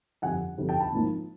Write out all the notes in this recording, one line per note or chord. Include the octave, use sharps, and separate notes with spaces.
G1 F2 D3 G3 F#5 G#5
G1 F2 D3 G3
G5 A5
A5 B5
G#1 G#2 F3 A#3